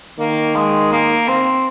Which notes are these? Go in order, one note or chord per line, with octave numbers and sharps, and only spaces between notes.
D#3 A#3
G#3
A#3
C4